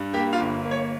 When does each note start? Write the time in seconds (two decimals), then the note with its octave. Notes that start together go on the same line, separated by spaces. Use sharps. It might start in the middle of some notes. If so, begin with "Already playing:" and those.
Already playing: G2 G3
0.14 A#3 G4 G5
0.33 F4 F5
0.40 G1
0.65 A#3
0.71 C#5